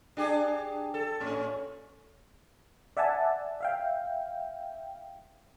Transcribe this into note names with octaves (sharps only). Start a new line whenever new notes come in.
D4 G4 G#4
A4
A2 C#4
D5 E5 F#5 G#5 A5
E5 F5 G5